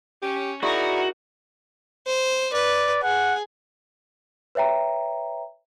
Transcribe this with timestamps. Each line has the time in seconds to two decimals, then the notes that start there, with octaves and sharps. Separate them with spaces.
0.22 C#4 G4
0.63 D#4 E4 F#4 G#4 A#4 D5 B5
2.07 C5
2.53 B4 D5
3.03 G#4 F#5
4.55 B4 C#5 E5 G5 A#5